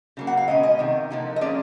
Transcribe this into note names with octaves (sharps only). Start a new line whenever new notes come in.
C#3 F#3 A#3
F#5
F5
B2 G#3 C#4 D#5
D#5
C3 D#3
D3 F3 A#3 D#4
D#5
F3 G#3 C#4 D5